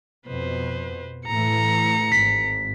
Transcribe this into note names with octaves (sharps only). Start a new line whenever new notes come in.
F2 B2 B4 C5
A2 E3 A3 A#5 C#7
G#1 B6